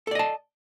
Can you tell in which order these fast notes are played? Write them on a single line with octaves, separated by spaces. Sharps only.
A4 D5 D#5 A5